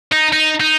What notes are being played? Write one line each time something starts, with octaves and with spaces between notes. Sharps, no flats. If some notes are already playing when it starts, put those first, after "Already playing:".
D#4
D#4
D#4